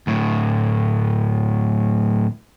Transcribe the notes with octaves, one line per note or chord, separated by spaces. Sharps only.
D2 A2